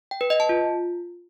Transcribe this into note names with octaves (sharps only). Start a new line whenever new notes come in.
G5
B4
D#5
A5
F4